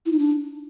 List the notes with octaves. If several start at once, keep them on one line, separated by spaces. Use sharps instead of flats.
E4
D#4
D4